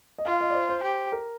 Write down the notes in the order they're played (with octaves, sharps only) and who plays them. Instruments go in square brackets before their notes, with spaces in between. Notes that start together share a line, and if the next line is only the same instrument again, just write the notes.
[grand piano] D#5
[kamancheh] F4 [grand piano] F5
[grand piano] D#5
D5
C5
C5
[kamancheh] G4
[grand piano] A#4